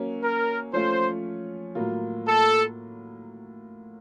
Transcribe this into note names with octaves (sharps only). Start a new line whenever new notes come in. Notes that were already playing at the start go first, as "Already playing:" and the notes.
Already playing: F#3 A#3 C#4
A#4
F3 A3 C#4 F4 C5
A2 F#3 A#3 F4
A4